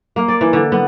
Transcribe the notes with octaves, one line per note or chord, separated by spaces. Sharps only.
A#3
D5
E3
D3
B3